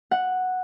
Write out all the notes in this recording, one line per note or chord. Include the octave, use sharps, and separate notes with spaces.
F#5